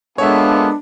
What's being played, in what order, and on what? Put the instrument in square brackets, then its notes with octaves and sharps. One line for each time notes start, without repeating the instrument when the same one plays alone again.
[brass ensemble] G#3 B3 [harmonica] A#3 F4 A4 [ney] D4 [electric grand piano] C#5 E5